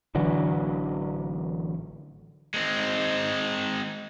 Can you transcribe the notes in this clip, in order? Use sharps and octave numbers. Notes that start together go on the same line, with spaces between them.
A1 D3 E3 F#3
G#3 C4